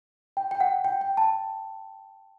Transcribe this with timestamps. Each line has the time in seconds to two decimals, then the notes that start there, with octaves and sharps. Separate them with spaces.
0.37 G5
0.51 G5
0.61 F#5
0.85 G5
1.01 G5
1.17 A5